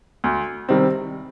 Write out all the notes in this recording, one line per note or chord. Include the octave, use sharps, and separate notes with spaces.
D2
C3 D#3 G3 C4